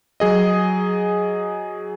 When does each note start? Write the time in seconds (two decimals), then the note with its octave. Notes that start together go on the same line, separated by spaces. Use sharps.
0.20 F#3 G#4 D#5